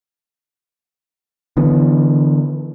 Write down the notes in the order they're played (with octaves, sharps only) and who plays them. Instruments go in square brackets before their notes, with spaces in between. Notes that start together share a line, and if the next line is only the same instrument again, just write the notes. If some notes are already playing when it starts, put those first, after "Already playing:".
[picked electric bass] D3 E3 B3